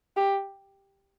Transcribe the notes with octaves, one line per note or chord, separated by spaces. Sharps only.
G4